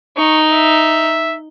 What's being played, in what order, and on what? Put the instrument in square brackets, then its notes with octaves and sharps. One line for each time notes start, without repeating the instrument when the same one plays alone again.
[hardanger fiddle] D#4 [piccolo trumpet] C#6
[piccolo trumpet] E5